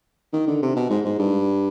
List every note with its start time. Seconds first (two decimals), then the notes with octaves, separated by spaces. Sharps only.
0.33 D#3
0.47 D3
0.63 C3
0.76 B2
0.90 G#2
1.05 G#2
1.19 G2